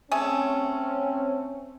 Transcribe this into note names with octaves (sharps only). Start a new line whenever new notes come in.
A3 C4 C#4 G#4 G#5